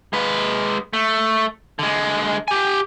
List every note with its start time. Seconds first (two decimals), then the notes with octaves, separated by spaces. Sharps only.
0.13 G#3 B4
0.93 A3
1.79 D3 G#3
2.48 G4 G#5